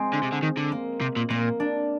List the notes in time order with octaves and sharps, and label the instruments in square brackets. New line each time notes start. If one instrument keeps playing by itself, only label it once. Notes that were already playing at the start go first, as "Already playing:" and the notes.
Already playing: [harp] G#3 C4
[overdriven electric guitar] D3
C3
D3
D#3
D3
[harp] A#3
[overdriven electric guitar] C3
A#2
[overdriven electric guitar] A#2 [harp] A#3
[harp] D4